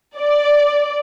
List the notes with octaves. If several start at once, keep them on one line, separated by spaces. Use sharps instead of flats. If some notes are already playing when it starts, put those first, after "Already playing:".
D5